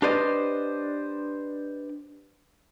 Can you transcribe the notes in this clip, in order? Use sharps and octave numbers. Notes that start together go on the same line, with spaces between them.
D4 G4 B4 C5 D5 D#5